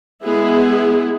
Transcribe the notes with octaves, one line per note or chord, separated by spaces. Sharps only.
G#3 B3 E4 G#4